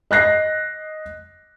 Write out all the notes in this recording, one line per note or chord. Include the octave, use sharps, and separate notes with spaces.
D#5 F#6 A#6 C7